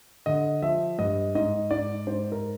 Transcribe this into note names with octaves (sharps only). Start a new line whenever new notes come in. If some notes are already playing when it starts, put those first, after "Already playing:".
D3 D#5
F3 E5
G2 D#5
G#2 D#5
G#2 D5
G#2 C5
A#4